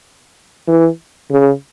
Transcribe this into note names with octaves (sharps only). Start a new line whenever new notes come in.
E3
C#3